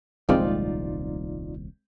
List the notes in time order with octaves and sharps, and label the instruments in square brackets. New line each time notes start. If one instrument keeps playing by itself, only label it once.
[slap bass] D#1 C2 F3 [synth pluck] G#3 C4 [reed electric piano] D#4 F4 D5